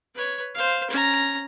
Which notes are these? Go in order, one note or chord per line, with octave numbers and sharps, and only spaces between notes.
B4 C#5
C5 F5
C#4 A#5